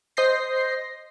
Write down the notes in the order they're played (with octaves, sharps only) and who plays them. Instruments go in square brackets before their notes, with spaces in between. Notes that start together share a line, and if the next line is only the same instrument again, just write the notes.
[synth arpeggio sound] C5 D#5 G6 A#6 C7